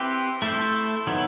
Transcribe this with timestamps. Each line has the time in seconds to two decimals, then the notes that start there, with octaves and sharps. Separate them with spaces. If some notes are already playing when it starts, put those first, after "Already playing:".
Already playing: C4 E4 G4 B4
0.42 A3 E4 A4 C5
1.07 D#3 F#3 B3 E4